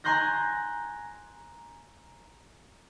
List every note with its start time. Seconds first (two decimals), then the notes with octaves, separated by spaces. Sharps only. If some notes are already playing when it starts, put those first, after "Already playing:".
0.04 G#5 A#5 C6 F#6 G6 A#6